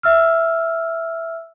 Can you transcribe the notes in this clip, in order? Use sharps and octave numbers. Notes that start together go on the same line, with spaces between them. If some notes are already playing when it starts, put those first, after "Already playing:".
E5 E6 F6